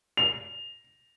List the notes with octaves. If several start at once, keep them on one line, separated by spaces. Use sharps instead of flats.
F7